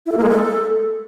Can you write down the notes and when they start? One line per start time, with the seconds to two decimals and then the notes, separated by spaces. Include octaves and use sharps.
0.06 E4
0.12 A4
0.17 A#3
0.23 G#3
0.29 A4